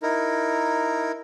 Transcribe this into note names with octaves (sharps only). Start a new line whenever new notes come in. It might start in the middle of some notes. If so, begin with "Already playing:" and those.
D#4 E4 A#4